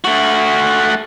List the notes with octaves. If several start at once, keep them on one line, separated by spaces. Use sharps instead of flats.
A3 F#4